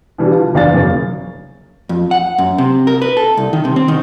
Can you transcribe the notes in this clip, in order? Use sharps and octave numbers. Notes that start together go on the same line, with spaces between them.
B2 D3 E3 G3
F4
F#1 E2 D4 F5 G#5 A6
F#2 C#3 A#3
F2
F#5
F#2
C3
A#4
B4
A4
C2
D#3
C3
C4
D#3